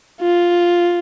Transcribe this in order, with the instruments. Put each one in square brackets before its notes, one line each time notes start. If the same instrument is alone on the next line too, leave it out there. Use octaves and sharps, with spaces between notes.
[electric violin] F4